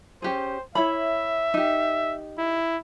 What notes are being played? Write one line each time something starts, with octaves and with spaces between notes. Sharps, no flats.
C#4 G4 G#4 C5
E4 C#5 E5 B5
D#4 G4
E4